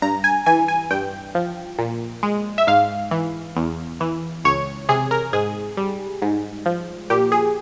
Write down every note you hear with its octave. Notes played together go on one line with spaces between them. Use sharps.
G2 A#5
G#5
E3 G#5
G#5
G2 G5
F3
A#2
G#3
E5
G#2 F5
E3
E2
E3
C#2 C#5
C3 G#4
A#4
G#2 G#4
G3
G#2
F3
A#2 G4
G#4